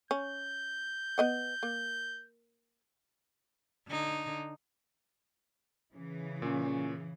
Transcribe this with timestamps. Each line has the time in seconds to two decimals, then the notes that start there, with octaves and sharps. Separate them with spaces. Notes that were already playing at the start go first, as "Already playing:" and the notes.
0.11 C#4 G6
1.18 B3 D#5 F#5
1.63 A#3
3.88 D3 D#4
5.95 C#3 E3
6.42 A#2 C#4